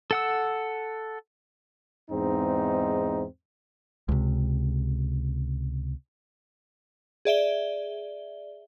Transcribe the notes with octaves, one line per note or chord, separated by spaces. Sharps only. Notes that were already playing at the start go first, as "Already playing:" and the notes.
A4 F#5 E6
E2 G#2 C4 D#4
C#2 C3
G#4 D5 E5 G7